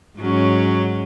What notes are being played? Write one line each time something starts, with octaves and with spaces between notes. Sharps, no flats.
G#2 F#3 C#4